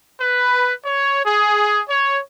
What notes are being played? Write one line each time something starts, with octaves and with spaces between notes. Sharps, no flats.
B4
C#5
G#4
C#5